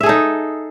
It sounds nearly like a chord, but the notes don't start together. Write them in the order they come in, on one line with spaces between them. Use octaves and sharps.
E5 G#4 A4 D#4